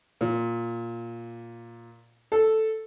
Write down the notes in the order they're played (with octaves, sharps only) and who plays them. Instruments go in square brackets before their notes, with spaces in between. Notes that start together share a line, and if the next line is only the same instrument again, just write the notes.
[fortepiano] A#2
A4